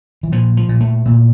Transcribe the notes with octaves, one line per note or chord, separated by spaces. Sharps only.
E3
A#2 F3
F3
A#2
A3
A#2